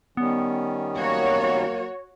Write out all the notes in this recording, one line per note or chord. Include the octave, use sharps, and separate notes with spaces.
D#3 G3 B3 C#4
F#3 A#3 F#4 C#5